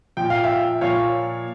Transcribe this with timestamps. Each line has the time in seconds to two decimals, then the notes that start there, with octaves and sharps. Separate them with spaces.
0.17 A#2 F3 G5
0.30 F5
0.44 E5 G5
0.81 A#2 F3 C#5 F5